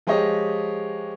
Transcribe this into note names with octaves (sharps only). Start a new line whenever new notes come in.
F3 G#3 G4 C#5 D#5